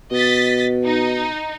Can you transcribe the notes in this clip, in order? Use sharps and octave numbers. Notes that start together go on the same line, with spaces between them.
B2 D#5 A6 B6
D#4